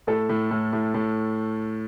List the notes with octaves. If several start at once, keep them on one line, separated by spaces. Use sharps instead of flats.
A2 A4
A2
A2
A2
A2